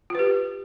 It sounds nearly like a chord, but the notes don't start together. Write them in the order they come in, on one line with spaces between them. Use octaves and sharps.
F4 B4 G4